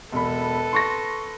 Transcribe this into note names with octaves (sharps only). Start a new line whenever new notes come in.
E1 A4 B4 B5
C6 C#6 A#6